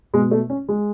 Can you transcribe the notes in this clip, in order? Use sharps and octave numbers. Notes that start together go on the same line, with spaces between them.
B2 G#3
A3
C#4
G#3